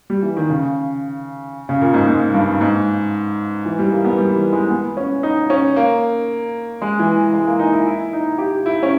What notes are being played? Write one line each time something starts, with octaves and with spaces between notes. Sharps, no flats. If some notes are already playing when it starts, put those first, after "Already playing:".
G3
E3
D#3
C#3
C#3
A#2
G#2
G#2
G2
G#2
E3
G3
A#3
B3
G3
E3
G#3
B3
C#4
D#4
C#4
A#3
G#3
E3
G#3
A#3
D#4
E4
E4
D#4
G4
E4
C#4